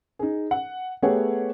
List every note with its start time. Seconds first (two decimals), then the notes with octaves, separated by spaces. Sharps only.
0.19 D#4 G#4
0.51 F#5
1.02 A3 B3 G4 G#4 C#5 F#5